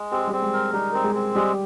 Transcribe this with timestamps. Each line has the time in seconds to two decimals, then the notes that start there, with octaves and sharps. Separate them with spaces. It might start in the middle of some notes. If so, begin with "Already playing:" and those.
Already playing: G#3
0.12 C4 G4
0.19 G#4
0.27 G3 G4
0.33 C4
0.42 G#3 G#4
0.53 A#4
0.73 G3 D#4 G4
0.92 C4 A#4
1.04 G#3 G#4
1.14 C4
1.35 G3 G#3 G4